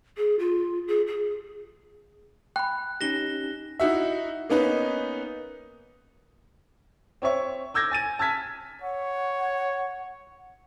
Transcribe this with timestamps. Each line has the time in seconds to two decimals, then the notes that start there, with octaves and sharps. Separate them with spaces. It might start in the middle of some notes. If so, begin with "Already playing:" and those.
0.17 G#4
0.39 F4
0.88 G#4
1.07 G#4
2.56 G5 B5 F#6
3.01 C#4 D#4 G4 A#6 E7 G7
3.80 D#4 E4 F#4 E5
4.49 A#3 B3 C#4 D#4 B4
7.22 C4 C#5 E5 C#6
7.74 D6 E6 G6 G#6 A#6
7.91 G#5 A6 D#7
8.19 A5 E6 F6 G#6 B6
8.82 C#5 F#5